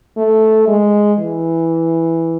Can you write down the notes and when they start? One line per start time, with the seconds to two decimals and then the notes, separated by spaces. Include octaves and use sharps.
0.17 A3
0.68 G#3
1.19 E3